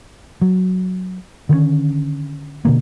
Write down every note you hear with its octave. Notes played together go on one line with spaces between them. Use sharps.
F#3
D3 D#3 G3 C#4
B2 D3 A#3